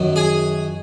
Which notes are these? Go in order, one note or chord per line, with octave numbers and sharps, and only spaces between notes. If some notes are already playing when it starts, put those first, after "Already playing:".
Already playing: F#2 D#3 F#3
G#4 G#5